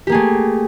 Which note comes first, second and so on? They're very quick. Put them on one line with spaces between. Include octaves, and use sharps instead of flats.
G4 A#3 G#4 A3